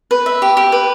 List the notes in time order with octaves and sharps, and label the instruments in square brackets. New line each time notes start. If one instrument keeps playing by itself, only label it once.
[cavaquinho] B4
E5
G4
G4
B4